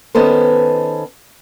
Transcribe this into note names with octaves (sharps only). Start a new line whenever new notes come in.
D#3 B3 C#4 A4 C5